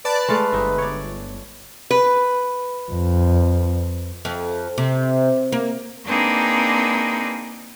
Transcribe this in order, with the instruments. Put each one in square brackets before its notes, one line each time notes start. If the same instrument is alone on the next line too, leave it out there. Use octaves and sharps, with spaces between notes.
[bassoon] B4 [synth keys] D5 A5
[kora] G#3 A3 F5
[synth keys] G1 [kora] D#4 E5
[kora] C#5 D5
[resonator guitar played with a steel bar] B4
[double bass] F2
[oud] F2
C3
A#3
[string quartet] A#3 C4 D4 D#4 G#4 B4